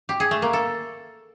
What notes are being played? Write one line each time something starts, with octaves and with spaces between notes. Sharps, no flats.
G4
G#4
A3
A#3
A4